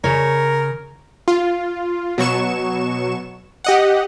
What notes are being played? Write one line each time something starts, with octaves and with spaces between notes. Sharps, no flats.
C#3 A#4 C#5
F4
B2 F#3 C#6 E7
G4 D#5 F#5